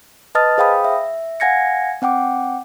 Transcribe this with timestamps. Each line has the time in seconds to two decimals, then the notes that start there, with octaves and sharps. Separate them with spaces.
0.35 B4 D#5 A5 D#6 F6 A6
0.58 G#4 C5 F5 G5 B5 D#6
0.85 E5
1.40 F5 F#5 G#5 G#6 A#6 C#7
2.02 C4 F#5 G5 D6